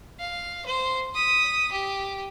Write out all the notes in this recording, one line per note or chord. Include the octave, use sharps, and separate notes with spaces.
F5
C5
D#6 B6
G4